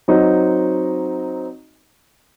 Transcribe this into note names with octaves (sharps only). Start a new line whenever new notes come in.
F#3 C4 D#4 D#5